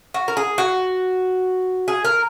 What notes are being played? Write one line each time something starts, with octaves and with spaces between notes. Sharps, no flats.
F#4
A#4
G#4
F#4
G#4
A#4